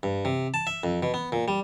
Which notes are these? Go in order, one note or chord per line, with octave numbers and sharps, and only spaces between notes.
G2
C3
A5
E5
F2
B2
B3
A#2
G3